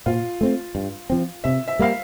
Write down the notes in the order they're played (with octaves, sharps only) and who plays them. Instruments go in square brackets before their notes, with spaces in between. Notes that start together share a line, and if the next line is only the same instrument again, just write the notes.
[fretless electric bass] A#2 [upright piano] F4
[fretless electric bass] A3 C4
G2
F3 C4
[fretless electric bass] C3 [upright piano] E5
[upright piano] E5
[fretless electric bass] G3 A#3 [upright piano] F5